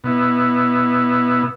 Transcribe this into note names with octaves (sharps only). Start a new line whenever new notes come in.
B2 B3 E4